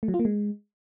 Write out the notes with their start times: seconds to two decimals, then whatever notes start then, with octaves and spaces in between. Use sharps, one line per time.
0.03 A3
0.08 F#3
0.14 F4
0.19 A#3
0.25 G#3